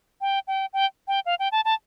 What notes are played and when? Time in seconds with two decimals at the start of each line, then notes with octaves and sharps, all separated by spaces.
0.21 G5
0.47 G5
0.73 G5
1.08 G5
1.26 F5
1.39 G5
1.52 A5
1.65 A5